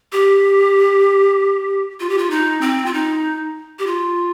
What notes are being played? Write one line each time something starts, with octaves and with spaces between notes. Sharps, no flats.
G4
F4
G4
F4
D#4
C4
F4
D#4
G4
F4